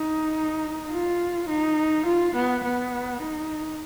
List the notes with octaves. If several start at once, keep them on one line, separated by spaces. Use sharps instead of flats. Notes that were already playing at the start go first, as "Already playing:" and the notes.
Already playing: D#4
F4
D#4
F4
B3
B3
D#4